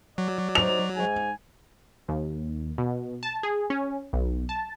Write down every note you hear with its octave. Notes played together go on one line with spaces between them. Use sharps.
F#3 D5
D#4 C5 F7
G#2 G#5
D#2
B2
A5
G#4
C#4
B1
A5